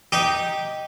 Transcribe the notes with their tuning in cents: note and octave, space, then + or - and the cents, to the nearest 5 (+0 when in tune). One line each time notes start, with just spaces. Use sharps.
D#4 +0 G4 -5